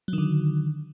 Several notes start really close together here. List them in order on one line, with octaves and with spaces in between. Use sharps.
F#3 D#3 D3